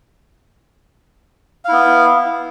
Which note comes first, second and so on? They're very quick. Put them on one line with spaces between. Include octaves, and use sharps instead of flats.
F5 E4 B3